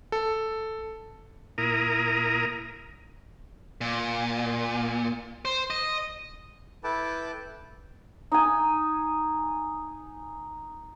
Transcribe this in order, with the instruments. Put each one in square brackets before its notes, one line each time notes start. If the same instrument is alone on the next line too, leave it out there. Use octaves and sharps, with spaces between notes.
[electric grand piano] A4
[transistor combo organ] A#2 E4 A#4 A#5 D#6
[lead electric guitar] A#2
C5
D#5
[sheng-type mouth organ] E4 A4 B4 G5 A5 D6
[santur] D#4 G#5